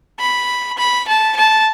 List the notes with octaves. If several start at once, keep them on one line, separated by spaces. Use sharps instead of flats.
B5
B5
A5
A5